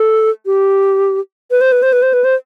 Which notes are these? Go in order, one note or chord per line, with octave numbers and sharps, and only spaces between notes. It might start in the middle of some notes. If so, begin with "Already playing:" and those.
Already playing: A4
G4
B4
C5
B4
C5
B4
C5
B4
C5